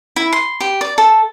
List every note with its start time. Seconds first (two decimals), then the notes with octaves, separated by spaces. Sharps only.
0.16 E4
0.32 C6
0.60 G4
0.81 D5
0.98 A4